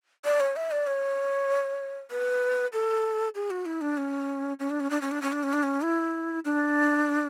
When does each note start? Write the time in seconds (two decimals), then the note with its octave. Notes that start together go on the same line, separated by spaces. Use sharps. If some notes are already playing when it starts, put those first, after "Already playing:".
0.25 D5
0.40 C#5
0.56 E5
0.71 D5
0.87 C#5
2.11 B4
2.73 A4
3.35 G#4
3.51 F#4
3.66 E4
3.81 D4
3.97 C#4
4.60 C#4
4.70 D4
4.80 C#4
4.90 D4
5.01 C#4
5.11 D4
5.22 C#4
5.32 D4
5.43 C#4
5.53 D4
5.63 C#4
5.83 E4
6.45 D4